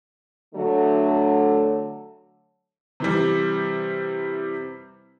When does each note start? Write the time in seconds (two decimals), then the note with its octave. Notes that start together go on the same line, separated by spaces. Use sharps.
0.54 D3 F#3 A3
3.00 C3 E3 G3